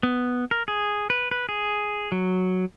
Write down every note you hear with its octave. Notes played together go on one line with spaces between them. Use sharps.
B3
A#4
G#4
B4
B4
G#4
F#3